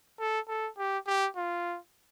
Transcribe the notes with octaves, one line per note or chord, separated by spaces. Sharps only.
A4
A4
G4
G4
F4